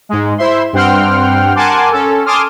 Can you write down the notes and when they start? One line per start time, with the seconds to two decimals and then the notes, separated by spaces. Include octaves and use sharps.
0.09 G#2 G#3
0.38 E4 C5 E5 C6
0.73 G2 C4 F#5 G5 C6 F6
1.55 A#4 F#5 G#5 A5 C6 D6
1.92 C#4 A4
2.26 G#5 A5 C6 D6 D#6 F6